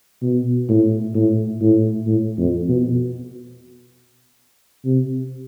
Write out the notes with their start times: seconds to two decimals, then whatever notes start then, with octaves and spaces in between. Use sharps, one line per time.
0.22 B2
0.69 A2
1.15 A2
1.61 A2
2.07 A2
2.38 F2
2.69 B2
4.85 C3